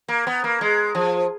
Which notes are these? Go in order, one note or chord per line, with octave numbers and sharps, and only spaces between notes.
A#3
B3
A#3
G#3
F3